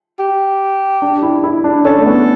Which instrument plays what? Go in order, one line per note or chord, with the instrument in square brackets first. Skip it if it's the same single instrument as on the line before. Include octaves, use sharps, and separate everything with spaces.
[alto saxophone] G4
[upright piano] D4
E4
E4
D4
[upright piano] C#4 [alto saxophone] A4
[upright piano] A3
B3